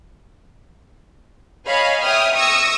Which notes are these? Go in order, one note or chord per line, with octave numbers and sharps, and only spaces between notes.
C#5 D#5 F5 G#5 B5
C#5 E5 G5 D#6 F6
C#6 D#6 E6 A#6 C#7